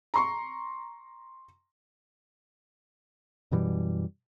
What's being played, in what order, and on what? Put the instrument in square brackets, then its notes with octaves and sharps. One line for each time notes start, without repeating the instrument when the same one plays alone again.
[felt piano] A#5 C6 C#6
[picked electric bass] F#2 B2 E3 G3